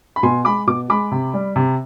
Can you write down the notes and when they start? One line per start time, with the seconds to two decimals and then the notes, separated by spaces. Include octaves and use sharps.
0.16 B5
0.23 B2 G#5 C6
0.45 G#3 B5 D6
0.67 B2 D6
0.90 G#3 B5 D6
1.12 C3
1.34 G3
1.56 C3